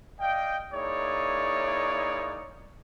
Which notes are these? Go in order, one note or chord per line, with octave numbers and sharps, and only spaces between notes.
D5 D#5 F5 G5
A#3 D#4 E4 G#4 C#5 D5